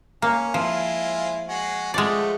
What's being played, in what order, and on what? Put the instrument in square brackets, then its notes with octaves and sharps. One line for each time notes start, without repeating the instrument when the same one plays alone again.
[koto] A#3 [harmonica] C#4
[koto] F3 [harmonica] G#3 E4 F4
[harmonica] G#3 F#4
[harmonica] F3 A3 F#4 [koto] G#3 D5